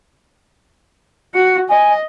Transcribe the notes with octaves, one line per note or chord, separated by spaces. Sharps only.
F#4 C#7
D#5 G#5